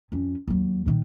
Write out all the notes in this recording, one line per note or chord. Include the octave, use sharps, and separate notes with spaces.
F2 C#4
D#2 F#3
A#2 D#3